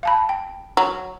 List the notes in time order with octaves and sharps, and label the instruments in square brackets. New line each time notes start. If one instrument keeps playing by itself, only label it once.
[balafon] F5 A5 B5
G5
[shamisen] F#3